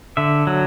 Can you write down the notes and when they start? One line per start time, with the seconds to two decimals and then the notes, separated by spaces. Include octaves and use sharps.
0.17 D3 E5
0.47 F#3